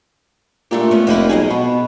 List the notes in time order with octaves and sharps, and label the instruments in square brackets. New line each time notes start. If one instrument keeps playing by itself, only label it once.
[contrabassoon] A#2 [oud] A3 D4 G4
[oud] B3 C#4
[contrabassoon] F1 [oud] A#3 D#4 B4
[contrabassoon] B1 [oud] G#4 A4 D#5
[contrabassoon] B2 [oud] B3